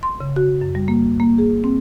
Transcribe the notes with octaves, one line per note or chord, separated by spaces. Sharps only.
C6
C#3
F#4
F#2
G3
A#3
A#3
G#4
C4